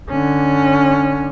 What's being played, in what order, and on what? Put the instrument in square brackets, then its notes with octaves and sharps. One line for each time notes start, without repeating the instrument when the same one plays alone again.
[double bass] D3 C#4